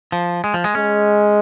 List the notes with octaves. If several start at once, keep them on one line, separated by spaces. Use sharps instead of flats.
F3
G#3
F3
G#3
G#3 C#4